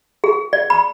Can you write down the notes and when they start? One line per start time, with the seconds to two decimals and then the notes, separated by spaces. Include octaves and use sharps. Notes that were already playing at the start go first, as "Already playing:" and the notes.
0.24 G#4
0.53 D5
0.70 B5